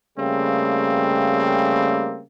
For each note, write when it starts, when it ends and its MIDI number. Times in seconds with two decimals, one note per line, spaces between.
0.18 2.22 49
0.18 2.22 55
0.18 2.22 57
0.18 2.22 58
0.18 2.22 60